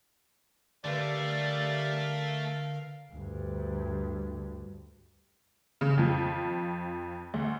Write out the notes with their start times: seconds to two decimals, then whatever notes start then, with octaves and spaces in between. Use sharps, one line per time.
0.84 D3 G3 A3 G4 A#4 B4 D5 F5
3.13 D2 G2
5.81 C#3
5.98 F2 F3
7.34 D2